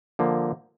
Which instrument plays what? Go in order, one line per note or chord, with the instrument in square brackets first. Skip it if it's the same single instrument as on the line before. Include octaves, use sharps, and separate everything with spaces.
[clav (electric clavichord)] D3 F3 A#3